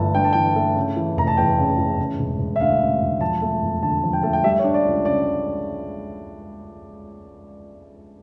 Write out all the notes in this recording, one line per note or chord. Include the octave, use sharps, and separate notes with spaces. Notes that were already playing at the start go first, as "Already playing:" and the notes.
Already playing: G1 E3 A3 A5
G2 G5
A5
E3 G5
A3
C#3
E3
F1 A#5
A5
E2 G5
C#3
E3
C#3
E1
E1
E5
D2 F5
C#3
E1
F3 A5
A3
F2
D3 A5
F3
G5
A3 A5
G5
G3 E5
C#5
D4
D5
C#2
C#3 D5